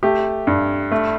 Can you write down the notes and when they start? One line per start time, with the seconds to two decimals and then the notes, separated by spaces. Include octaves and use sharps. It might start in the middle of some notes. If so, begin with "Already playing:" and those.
0.03 A3 G4
0.47 G2
0.92 A3